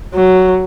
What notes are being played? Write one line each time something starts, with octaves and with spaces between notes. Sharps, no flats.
F#3